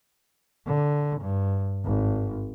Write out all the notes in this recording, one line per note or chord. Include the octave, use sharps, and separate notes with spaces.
D3
G2
G#1